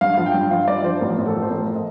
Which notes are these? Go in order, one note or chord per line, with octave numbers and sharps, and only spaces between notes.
G2 F5
F3 F5
G5
G2
F3 F5
G2 D5
F3 C5
A1 A#4
A1
A4
F3
C5
A1 A#4
D#5